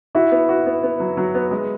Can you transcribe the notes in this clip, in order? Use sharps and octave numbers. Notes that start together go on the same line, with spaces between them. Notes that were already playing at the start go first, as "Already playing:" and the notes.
E4 F#4
B3
F#4
B3
B3
F#3
F#3
B3
G#3